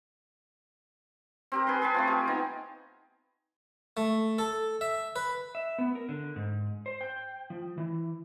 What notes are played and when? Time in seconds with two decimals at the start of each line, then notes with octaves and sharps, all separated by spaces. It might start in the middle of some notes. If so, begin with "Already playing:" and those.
1.52 C4 G4 A#4
1.67 G#4 B4 C6
1.82 G#4 B4 G5 A5
1.94 A3 C4 F4
2.07 G4 G#4
2.28 B3 D#4
3.97 A3
4.38 A4
4.81 E5
5.16 B4
5.55 E5
5.79 B3
5.95 A#4
6.09 D3
6.36 G#2
6.86 C5
7.01 G5
7.50 F3
7.78 E3